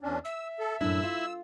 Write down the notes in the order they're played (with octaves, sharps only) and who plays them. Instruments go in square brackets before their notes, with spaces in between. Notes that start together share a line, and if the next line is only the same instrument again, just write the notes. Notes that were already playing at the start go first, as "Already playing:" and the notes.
[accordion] E2 C#4 D4
[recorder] E5 [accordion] E6
[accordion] A4
[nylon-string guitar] F#2 A2 D4 [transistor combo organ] E4 [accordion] E6
[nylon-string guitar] F4